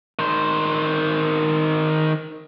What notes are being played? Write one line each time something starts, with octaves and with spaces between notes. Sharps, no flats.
D#3 C5